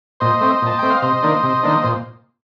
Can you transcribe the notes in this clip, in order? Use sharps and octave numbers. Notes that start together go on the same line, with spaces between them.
A#2 C5 D#5
A3 C4
A#2 A5
A3 C4 G5
F5
C3 C5 D#5
D#3 A#3 D4
C3
D#3 A#3 D4
A#2 C5